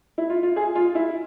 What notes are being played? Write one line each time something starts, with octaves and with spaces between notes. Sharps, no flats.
E4
F4
F4
G#4
F4
E4